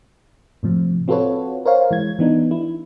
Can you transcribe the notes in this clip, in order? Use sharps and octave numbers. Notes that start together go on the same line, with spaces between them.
A2 C3 F3
C4 F4 F#4 A4 B4 C#5
A#4 C5 C#5 F5
E3 G#3 G#6
E3 B3 D4 D#4
E4